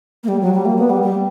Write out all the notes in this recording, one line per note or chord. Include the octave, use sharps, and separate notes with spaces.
A#3
G3
F#3
G3
A#3
B3
G3
G3